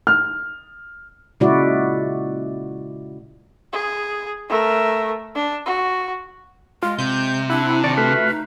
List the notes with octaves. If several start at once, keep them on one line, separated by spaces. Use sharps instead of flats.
F6
A#2 C#3 G#3 E4 F#4 D5
G#4
A3 A#4
D4
F#4
G#3 F4
C3 G6
D4 E4 F#5
D#3 D5 C#6
A3 F4 F#4 B4
D#4